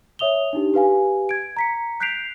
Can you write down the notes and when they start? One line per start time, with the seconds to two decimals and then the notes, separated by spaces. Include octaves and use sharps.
0.19 C#5 E5 D#6 F7 G7
0.53 D4 D#4 G4
0.74 G4 B4 F5 G#5
1.29 G#6 D7
1.57 A#5 B6 C#7
2.00 F#6 G6 B6 C7 D7 F7